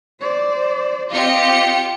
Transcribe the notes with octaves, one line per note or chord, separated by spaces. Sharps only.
C5 D5
C4 F4 G4 D#5 C#7